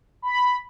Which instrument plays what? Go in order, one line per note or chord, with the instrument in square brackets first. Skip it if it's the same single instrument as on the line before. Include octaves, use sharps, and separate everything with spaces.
[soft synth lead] B5